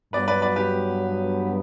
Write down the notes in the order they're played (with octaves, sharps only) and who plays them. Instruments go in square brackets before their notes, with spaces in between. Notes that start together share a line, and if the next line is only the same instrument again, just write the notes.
[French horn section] G2 F#3 B3 [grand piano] B4 D5
[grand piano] B4 D5
B4 D5
G4 B4